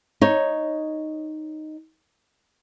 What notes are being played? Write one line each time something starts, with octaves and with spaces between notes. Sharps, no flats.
D#4 C#5